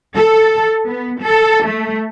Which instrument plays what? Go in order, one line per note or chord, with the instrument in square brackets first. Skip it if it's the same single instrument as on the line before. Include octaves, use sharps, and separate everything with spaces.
[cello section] A4
B3
A4
A3